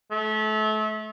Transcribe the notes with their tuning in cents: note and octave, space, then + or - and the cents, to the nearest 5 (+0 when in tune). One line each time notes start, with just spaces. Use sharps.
A3 -30